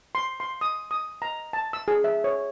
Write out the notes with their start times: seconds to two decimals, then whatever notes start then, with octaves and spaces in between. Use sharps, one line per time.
0.15 C6
0.40 C6
0.61 D#6
0.91 D#6
1.22 A#5
1.53 A5
1.73 E6
1.88 G#4
2.04 E5
2.24 C#5